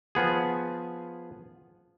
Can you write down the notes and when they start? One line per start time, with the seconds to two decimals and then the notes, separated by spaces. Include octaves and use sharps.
0.15 F3 B3 G#4